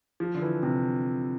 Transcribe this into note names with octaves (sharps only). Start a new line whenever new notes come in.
F3
D3
E3
C3